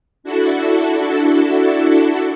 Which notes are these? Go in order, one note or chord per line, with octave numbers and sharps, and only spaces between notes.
D4 E4 F#4 A4